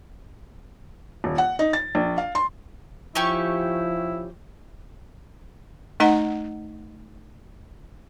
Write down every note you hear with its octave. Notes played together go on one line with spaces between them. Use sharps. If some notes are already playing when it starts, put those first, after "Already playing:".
D#1
F#5
D#4
A6
A#1
F5
C6
F3 C#4 E4 G4 C#6
A3 D#4 D#5 F#5 A#5